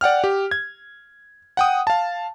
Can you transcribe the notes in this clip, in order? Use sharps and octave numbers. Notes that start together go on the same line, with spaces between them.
D5 F#5 G5 F6
G4
G#6
F#5 G5 D#6
F5 A5